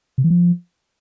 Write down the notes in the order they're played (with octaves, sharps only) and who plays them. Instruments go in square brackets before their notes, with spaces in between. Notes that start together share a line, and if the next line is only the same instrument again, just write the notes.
[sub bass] C3
E3
F3